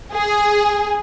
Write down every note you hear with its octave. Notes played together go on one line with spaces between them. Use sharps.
G#4